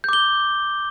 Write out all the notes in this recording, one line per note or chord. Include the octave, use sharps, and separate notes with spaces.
D6 G6 G7